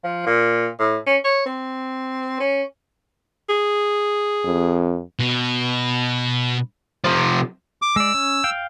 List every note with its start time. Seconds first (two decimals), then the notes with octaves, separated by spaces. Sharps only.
0.04 F3
0.27 A#2
0.79 A2
1.07 C#4
1.24 C#5
1.46 C4
2.40 C#4
3.49 G#4
4.45 F2
5.19 B2
7.04 C3 F3
7.82 D6
7.96 G#3 D5 E6
8.14 C#4
8.44 F5 G5